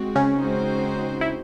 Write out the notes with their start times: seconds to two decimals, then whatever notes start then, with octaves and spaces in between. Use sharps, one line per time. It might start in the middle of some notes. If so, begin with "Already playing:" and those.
Already playing: G#3 C4 F#4
0.15 C#3 C#4
0.38 G#3 C4 D#4 F#4 C5
1.21 E4